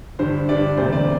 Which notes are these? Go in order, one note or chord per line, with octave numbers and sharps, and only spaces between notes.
G2 D3 G3 D4 C5
G2 D3 G3 D4 D5
E1 D2 C3 C5
D5